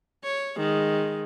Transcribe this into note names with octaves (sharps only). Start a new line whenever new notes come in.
C#5
D#3 G#3